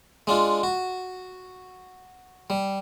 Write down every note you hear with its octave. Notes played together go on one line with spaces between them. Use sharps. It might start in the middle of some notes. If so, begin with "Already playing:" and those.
G#3 D4 F4
F#4
G3